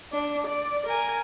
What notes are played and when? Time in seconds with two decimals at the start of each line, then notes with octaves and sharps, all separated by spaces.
0.12 D4
0.47 D5
0.86 A#4 G#5